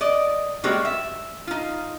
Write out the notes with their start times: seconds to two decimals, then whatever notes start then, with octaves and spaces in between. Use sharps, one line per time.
0.01 D5 D#5
0.64 G3 G#3 A#3 C4 F#4 G4
0.85 E5
1.47 D#4 F4